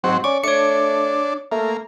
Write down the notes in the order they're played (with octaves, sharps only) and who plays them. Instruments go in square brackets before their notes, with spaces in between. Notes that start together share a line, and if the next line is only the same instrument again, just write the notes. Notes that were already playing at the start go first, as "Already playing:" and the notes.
[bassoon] G#2 [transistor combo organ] F#3 C4
[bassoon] C#4 [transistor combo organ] D5 [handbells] C#6
[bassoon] A3 [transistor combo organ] D4 [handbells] C#5 C#7
[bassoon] A3 [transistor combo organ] A#3